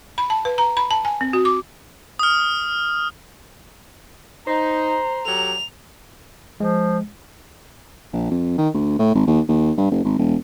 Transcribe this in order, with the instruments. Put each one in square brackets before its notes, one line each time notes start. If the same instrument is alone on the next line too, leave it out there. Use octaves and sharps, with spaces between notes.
[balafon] B5
A5
B4
A#5
B5
A5
G#5
C4
F#4
D6
[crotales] D#6 F6
[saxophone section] D#4 [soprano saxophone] C5 [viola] A#5
[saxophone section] F#3 G4 A4 [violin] F7
[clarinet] F3 [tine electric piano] G#3
[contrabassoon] A#1
F2
D#3
D2
A2
G#1
D#2
D#2
G2
F#1
G#1
E1